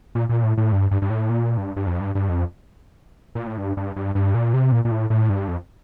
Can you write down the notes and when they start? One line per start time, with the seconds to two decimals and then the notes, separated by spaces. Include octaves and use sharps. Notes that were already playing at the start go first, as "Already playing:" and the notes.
0.15 A#2
0.29 A#2
0.43 A2
0.57 A2
0.72 G2
0.91 G2
1.02 G2
1.10 A2
1.29 A#2
1.58 G2
1.76 G2
1.87 F2
2.01 G2
2.15 G2
2.29 F2
3.35 A#2
3.47 A2
3.58 G2
3.77 G2
3.96 G2
4.15 G2
4.34 A#2
4.54 C3
4.72 A#2
4.85 A#2
4.91 A2
5.10 A2
5.30 G2
5.48 F2